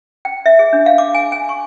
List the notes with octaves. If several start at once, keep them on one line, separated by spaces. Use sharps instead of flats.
G5
E5
G#4
D4
F5
D6
G#5
G#5
C#6